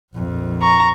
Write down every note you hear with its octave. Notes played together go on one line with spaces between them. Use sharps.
A#1 F2
A#5 C#6